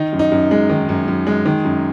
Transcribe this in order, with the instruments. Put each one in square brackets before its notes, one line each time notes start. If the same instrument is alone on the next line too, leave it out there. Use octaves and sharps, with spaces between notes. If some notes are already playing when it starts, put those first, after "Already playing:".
Already playing: [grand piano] D#3 D#4
F#2
D#4
F#2
G#3
D#3
F#2
F#2
G#3
D#3
F#2